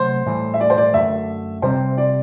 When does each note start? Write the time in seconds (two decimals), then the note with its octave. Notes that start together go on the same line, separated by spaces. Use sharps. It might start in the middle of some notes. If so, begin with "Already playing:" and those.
Already playing: C3 F#3 A3 C5
0.26 A2 E3 G3
0.54 E5
0.61 D5
0.70 C5
0.77 D5
0.94 F#2 D3 A3 E5
1.62 C3 G3 C4 C5
1.98 D5